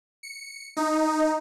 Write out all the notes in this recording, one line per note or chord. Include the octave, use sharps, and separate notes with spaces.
C#7
D#4